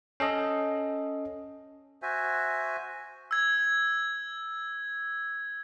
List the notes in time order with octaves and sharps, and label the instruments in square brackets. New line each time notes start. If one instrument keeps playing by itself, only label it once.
[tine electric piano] C#4 A4 D#5
[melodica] F#4 C5 E5 G#5
[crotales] E6 G#6